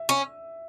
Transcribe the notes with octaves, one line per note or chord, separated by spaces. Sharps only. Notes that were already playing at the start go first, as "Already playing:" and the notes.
Already playing: E5
C#4